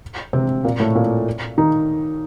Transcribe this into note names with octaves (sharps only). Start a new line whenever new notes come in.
C3 C4
A#2 A#3
A2 A3
A#2 A#3
D#3 D#4